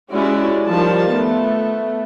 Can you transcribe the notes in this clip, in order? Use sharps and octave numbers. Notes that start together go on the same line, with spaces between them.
G#3 C#4 E4 F#4 G4 D5
D#3 F3 G3 F4 A5
A3 B3